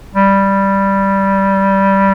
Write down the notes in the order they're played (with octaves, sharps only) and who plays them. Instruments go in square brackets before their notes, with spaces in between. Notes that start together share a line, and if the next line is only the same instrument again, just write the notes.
[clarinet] G3